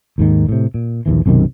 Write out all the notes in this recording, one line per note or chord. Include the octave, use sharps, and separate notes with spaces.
D#2 G#2 D#3
A2 C3
A#2
A#1 D#2 E3
B1 F#2 C3 D#3